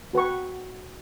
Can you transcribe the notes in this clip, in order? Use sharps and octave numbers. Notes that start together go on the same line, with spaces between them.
F#4 B4 G5 C#6